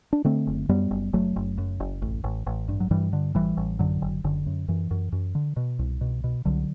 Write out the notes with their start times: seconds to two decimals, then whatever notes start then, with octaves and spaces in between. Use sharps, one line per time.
0.13 D4
0.24 D3 A3 C4
0.47 F#1
0.69 F#2 G3 B3
0.91 F#1
1.13 F#1 F#3 A3
1.36 F#1
1.58 F#2
1.80 F#1
2.02 A1
2.24 A1
2.47 A1
2.69 G2
2.80 F#3
2.91 G2 E3 G3
3.13 D3
3.35 A1 E3 G3
3.57 A1
3.79 F#2 D3 F#3
4.02 F#1
4.24 F#1 D3
4.46 F#2
4.68 F#2 E3
4.91 F#2
5.12 F#2
5.35 D3
5.57 B2
5.79 C2
6.01 B2
6.24 B2
6.45 C2 D3 F#3